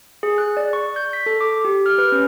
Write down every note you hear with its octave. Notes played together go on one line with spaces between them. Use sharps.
G#4
F#6
D5
C#6
G6
B6
A4
D6
G4
F6
B4
C#4